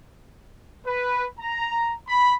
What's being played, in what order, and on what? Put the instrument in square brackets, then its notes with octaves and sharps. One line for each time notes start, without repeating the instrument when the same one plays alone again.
[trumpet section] B4
A#5
B5